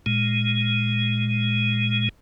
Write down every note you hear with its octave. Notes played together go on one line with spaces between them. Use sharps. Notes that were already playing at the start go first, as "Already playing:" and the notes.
A#2 G#3